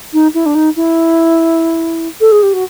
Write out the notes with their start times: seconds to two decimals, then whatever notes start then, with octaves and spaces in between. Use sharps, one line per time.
0.13 D#4
0.34 E4
0.45 D4
0.54 D#4
0.76 E4
2.20 A4
2.31 G#4
2.42 G4
2.53 F#4